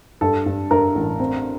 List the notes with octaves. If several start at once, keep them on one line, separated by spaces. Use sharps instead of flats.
G2 A4
G2
G2 A#4
A1
C4